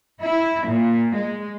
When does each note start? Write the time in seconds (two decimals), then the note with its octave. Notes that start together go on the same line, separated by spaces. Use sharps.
0.24 E4
0.68 A#2
1.17 G#3